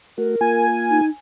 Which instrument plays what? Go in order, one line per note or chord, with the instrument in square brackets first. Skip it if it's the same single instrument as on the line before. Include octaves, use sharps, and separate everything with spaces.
[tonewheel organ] A3 F#4 [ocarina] A#4
[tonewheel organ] A#3 F4 [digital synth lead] G#5
[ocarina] D#4